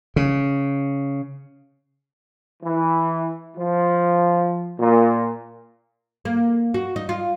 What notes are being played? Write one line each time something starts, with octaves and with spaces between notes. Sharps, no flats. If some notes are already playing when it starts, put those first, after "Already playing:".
C#3
E3
F3
A#2
A#3
F#4
D#4
F4